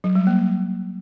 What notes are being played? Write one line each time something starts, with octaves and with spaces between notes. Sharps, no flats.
F#3
G3
A#3